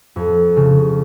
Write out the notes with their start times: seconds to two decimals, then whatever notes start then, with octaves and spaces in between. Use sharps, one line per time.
0.16 F2
0.56 C#3